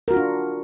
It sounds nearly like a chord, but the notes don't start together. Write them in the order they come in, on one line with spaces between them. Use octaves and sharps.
A#4 F#4 F4 D4